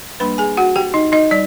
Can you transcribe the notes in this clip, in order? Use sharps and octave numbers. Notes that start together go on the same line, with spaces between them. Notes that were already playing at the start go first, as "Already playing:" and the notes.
G3 A#3 D4 B4 B5
G#4 G#5
F#4 F#5
G4 G5
D#4 D#5
D#4 D#5
G3 D5